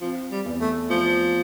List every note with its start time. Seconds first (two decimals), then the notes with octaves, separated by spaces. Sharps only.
0.01 F3 C4
0.31 G3
0.46 E2
0.61 A3
0.90 F3 A3